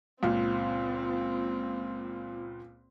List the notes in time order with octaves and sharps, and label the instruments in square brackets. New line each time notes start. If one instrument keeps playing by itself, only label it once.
[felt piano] C#2 A#2 [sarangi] C4